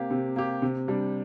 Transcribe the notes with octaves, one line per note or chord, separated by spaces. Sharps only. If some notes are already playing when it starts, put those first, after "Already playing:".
Already playing: C3 A#3 G4
C3
A#3 G4
C3
G3 D4